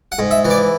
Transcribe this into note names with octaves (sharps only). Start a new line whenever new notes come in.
F#5
G#2
E5
E3
D5